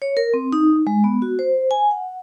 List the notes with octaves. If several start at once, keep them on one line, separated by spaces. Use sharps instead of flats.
C#5
A#4
C4
D#4
G#3
B3
F#4
C5
G#5
F#5